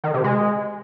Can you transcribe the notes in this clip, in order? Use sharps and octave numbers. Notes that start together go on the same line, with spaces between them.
D#3
C3
G#3